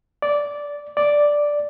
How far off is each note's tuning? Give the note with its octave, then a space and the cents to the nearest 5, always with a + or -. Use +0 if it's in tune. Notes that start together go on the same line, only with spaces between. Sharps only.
D5 -10
D5 +0